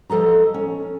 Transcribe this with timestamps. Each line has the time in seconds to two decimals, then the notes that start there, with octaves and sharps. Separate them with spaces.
0.10 F3 A4 D#5 A#5
0.54 C#4